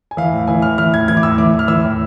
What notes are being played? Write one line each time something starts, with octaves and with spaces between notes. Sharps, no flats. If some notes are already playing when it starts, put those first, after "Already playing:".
G#5
E3 F5
A2
E3 G#5
A2 F6
E3 F6
A2 G#6
E3 G#6
D6
A2 E6
E3 D6
A2
F6
E3 E6
A2